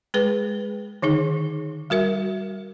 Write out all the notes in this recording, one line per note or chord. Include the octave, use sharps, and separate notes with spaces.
G#3 G#4 B4
D3 D#3 D#4 G#4
G3 F#4 A#4 E5